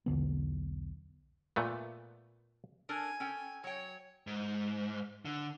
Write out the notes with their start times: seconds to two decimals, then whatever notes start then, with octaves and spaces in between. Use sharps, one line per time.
0.06 B1 E2 D3 B3
1.56 A#2 A3 B3
2.89 D4 A4 A#4 G#5
3.20 C#4 A4 G5
3.64 F#3 C#5 G5
4.27 G#2
5.25 D3